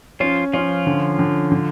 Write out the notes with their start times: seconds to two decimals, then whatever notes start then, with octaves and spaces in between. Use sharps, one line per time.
0.20 F3 C#4 F4
0.53 F3 C#4 F4
0.87 D3
1.19 D3
1.52 D3